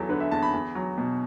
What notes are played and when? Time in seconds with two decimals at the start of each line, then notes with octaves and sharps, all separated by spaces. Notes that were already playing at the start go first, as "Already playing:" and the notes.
Already playing: E2 E3 F#3 A4
0.09 D3 B4
0.20 E5
0.31 E2 A5
0.43 B5
0.53 E2
0.75 F#3
0.98 B2